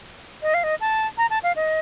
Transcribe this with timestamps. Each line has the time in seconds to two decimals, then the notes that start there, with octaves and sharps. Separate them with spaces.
0.43 D#5
0.54 F5
0.64 D#5
0.81 A5
1.18 A#5
1.30 A5
1.43 F5
1.56 D#5